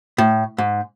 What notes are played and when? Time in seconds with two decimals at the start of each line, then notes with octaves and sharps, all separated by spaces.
0.18 A2
0.58 G#2